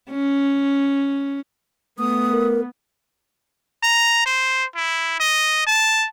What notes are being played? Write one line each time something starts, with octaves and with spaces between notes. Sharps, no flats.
C#4
A3 B3 D#6
A#4
A#5
C5
E4
D#5
A5